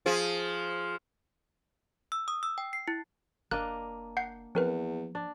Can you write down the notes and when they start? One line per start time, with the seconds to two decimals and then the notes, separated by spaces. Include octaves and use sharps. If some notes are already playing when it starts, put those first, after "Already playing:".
0.06 F3 G#4
2.12 E6
2.28 D#6
2.43 E6
2.58 G5
2.73 C7
2.88 E4
3.51 F#1 A#3 D4 D#5 F#6
4.17 F#5 G6 C7
4.55 E2 F3 C4 A#4 B4
5.15 D4